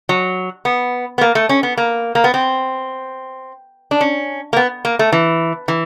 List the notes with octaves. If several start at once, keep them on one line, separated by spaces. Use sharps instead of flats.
F#3
B3
B3
A#3
A3
C#4
B3
A#3
A#3
B3
C4
D4
C#4
A#3
B3
A#3
A3
E3
E3